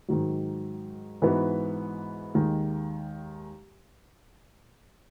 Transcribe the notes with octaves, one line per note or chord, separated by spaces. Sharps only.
G#2 D#3 F#3
G#2 E3 B3 D#4 F#4
D#2 D#3 G#3